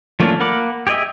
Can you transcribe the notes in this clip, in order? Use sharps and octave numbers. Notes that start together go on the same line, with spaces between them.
F3 A3 A#3 C#4 D4
A#3 A#4 F#5 B5 D6
G4 G#4 C#5 D#5 E5